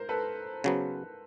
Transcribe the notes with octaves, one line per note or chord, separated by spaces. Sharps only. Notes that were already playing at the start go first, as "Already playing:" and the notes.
Already playing: A#4 C5
A4 B4
C#3 F#3 B3